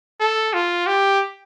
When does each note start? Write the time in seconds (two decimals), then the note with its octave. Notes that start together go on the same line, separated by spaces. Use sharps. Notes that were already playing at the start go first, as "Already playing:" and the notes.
0.20 A4
0.54 F4
0.87 G4